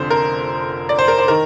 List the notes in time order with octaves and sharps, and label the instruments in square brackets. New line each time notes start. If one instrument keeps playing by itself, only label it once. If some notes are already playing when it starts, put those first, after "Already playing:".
Already playing: [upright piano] F1 F2 D3 C5
A#4
D5
C5
A#4
C5
D#3 A#4